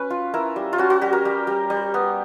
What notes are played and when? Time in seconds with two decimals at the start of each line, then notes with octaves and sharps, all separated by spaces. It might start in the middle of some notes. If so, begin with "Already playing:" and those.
Already playing: C#4 B4
0.10 F4
0.34 E4 A#4
0.56 G3
0.73 F4
0.78 C#4 F#4
0.90 F#4
1.02 G3 G4
1.13 A#4
1.25 G3
1.47 G3
1.70 G3
1.94 B3